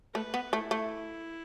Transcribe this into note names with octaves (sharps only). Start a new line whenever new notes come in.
A3 B4
B3
A3 E4
A3